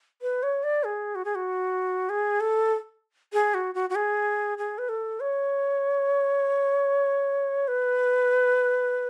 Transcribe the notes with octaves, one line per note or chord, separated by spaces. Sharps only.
B4
C#5
D5
G#4
F#4
G#4
F#4
G#4
A4
G#4
F#4
F#4
F#4
G#4
G#4
B4
A4
C#5
B4